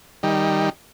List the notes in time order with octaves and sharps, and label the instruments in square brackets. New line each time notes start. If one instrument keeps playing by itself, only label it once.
[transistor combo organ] D#3 G3